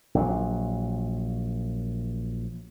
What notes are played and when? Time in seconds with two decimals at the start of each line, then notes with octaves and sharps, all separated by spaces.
0.15 A#1 F#3